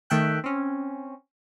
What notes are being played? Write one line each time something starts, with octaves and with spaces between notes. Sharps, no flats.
D#3 A3 E5 G5 F#6
C4 C#4